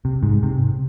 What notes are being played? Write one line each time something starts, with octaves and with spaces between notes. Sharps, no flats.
C3
G#2
C3